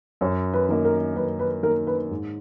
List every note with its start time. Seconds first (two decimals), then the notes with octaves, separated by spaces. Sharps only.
0.21 F#2 C#5
0.53 B4
0.69 D#3 A#3 D#4
0.85 A#4
1.16 F#2 B4
1.39 B4
1.63 D#3 A#4
1.66 A#3 D#4
1.87 B4
2.11 G#2